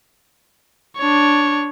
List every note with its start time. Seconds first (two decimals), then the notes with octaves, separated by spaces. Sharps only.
0.98 D4 C#5